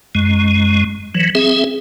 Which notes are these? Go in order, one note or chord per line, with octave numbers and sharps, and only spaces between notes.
F#2 G#3
E3 F#3
C4 G#4 E5